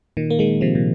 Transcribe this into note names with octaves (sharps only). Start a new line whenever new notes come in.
A#2 D#3
A#3
D#3 G#3
C3 F3
A#2